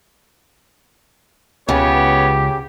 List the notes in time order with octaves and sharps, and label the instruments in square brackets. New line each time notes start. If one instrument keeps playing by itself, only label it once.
[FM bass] C#2 [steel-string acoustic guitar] C#3 [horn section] B3 C#5 [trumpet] G4